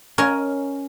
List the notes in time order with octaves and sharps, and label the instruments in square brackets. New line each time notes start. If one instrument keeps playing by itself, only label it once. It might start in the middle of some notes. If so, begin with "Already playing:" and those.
[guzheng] C#4 A#4 D#5 G#5